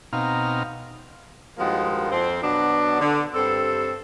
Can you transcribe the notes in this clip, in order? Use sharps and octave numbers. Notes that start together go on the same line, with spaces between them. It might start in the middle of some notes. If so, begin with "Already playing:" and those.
B2 C4 D#4 F5 A#5 F6
G2 D#3 F3 G#3 A#3 F#4
F2 C4
B2 F#3 B3 D4
D3
G2 C4 A4